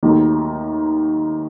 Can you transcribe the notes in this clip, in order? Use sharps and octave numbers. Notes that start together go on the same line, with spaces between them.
D#2 D#3 F#3 A3